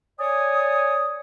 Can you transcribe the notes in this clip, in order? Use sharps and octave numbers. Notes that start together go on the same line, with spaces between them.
C#5 D5 G#5 D#6